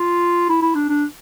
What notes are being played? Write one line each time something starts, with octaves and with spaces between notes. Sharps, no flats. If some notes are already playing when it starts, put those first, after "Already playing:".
Already playing: F4
E4
E4
D4
D4